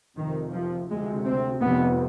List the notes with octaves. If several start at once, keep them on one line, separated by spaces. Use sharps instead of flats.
F1 F2 C3 D#3
F3
D2 C3 G#3
C4
F1 F2 C3 B3